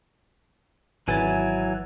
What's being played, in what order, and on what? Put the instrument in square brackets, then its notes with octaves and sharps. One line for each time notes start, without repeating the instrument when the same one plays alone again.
[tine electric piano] G#1 B4 A6 [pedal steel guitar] E3 F#3 G#5